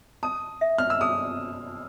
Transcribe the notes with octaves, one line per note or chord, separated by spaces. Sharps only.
A5 D#6
E5
F6
E6
G#4 D#6